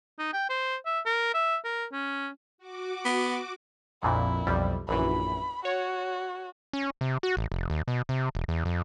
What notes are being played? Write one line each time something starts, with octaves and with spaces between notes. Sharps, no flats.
D#4
G5
C5
E5
A#4
E5
A#4
C#4
F#4 D6
B3
A#1 F2 A#2 E4
B1 F2 G3
A#1 F#2 E3 B5
F#4 C#5
C#4
C3
F#4
A1
F1
D#2
B2
C3
E1
E2
F2